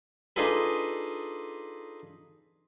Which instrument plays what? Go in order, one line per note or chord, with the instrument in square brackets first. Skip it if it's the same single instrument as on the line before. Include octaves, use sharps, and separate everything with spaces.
[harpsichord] D4 D#4 F4 G#4 A4 B4